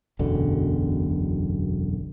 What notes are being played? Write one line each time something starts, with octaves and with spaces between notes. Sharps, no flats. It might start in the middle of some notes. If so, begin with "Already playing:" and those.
E1 B1 F#2 D3